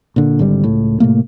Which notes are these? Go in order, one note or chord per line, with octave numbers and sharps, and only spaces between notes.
A#2 D3
G#1 D3 G3
C#2 A2
A2 C3 A3 A#3